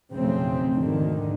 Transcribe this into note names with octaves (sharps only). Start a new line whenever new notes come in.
F1 B1 F2 C#3 A3 C4
D2 G#2 D3 D#3